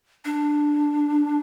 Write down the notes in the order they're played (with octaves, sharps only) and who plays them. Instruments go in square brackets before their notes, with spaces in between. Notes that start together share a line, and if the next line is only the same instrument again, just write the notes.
[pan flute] D4